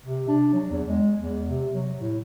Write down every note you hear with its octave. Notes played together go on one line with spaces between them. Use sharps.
C3
D4
F#3
E2
G#3
E2
C3
F#3
A2